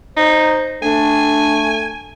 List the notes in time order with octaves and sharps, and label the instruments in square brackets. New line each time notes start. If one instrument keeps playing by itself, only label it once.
[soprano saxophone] D#4 [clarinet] C5
[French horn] A3 [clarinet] D4 [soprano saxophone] G#5